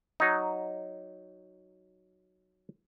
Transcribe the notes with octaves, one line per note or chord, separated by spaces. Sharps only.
F#3 D#4